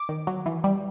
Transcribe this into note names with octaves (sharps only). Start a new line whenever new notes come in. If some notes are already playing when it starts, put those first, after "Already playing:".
Already playing: D6
D#3
F#3
E3
G3